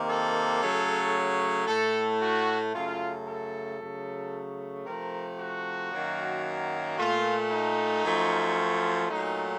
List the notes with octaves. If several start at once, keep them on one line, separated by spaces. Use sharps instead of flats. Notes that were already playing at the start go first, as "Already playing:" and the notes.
Already playing: C3 D#3 A#3
A4
C#3 F#3 A3
A2 A3 A4
F#4
F#2 C#3 A3 F4
A4
C#3 F#3 A3
C3 F3 A3 A#4
F#4
F#2 D#3 F#3 A#3
A#2 A3 F4
D#4
F#2 F3 A3
A#2 F#3 A3 D#4